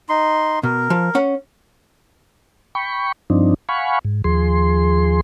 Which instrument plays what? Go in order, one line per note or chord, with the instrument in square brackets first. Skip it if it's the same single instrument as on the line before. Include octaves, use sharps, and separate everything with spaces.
[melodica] D#4 C6
[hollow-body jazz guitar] B2 [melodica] A#4
[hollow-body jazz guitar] F3
C#4 F#5
[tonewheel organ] G5 B5 C#6
G2 F3 C4 D4 D#4
F5 F#5 G#5 B5 C#6
G#2
D#2 F3 G#4 C6